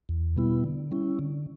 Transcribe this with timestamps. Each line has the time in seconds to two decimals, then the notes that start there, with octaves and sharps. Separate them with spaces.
0.09 E2
0.37 B2 G3 B3 E4
0.64 D3
0.91 G3 C#4 E4
1.19 D3